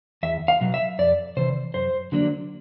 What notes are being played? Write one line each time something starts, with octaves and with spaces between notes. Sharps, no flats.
E2 E5
F5
B2 F#3
E5
F2 D5
C3 E3 C5
F#2 C5
D3 F#3 A#3 D4